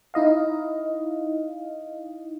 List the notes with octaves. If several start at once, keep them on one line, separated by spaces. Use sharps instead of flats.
D#4 E4 D#5 F5